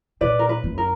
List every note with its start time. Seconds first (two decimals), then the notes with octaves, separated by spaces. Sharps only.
0.21 A#2 B4 D5
0.39 A#4
0.49 B4
0.64 F#2
0.78 A#4